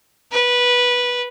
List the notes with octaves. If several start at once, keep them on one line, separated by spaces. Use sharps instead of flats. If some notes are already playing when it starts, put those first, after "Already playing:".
B4